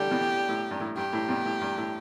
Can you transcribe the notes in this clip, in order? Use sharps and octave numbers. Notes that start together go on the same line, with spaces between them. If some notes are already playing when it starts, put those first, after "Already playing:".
Already playing: A2 D3 G3 G4
B2 E3
A2
G2
A2
G2 G4
A2
G2 B2
A2
G2
A2